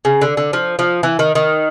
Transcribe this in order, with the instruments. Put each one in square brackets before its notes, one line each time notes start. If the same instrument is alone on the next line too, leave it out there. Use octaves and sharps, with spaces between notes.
[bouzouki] C#3
D3
D3
F3
F3
E3
D#3
D#3